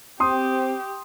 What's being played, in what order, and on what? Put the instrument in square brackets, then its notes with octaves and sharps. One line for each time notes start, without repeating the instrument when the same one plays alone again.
[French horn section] C4 [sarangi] G4 [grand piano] C6 D#6